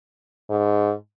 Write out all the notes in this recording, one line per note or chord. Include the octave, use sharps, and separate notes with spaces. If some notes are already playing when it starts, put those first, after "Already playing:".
G#2